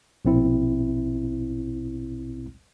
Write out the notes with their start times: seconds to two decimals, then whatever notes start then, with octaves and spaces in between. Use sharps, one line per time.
0.25 A#1 B2 C4 E4